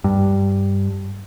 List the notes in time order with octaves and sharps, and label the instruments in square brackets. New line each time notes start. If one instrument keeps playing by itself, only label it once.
[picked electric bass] G2